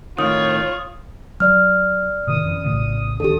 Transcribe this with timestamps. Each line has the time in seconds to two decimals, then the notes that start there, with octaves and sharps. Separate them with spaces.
0.18 A2 D#3 F4 C#5 D#6
1.40 F#3 D5 F6
2.27 A2 C3 D#3 D#6
2.45 F#2 E3
2.64 A#1 A2 C#3
3.20 D1 D#2 D4 G4 A4 D#6